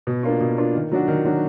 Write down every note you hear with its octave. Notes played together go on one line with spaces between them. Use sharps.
B2
A#3 D4 F4
B2
A#3 D4 F4
D#3
F#3 D4 F#4
D#3
F#3 D4 F#4